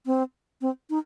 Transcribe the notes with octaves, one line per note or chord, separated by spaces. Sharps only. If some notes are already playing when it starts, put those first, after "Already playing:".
C4
C4
D#4